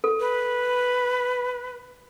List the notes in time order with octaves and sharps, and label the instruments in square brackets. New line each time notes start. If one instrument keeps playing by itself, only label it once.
[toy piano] A4
[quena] B4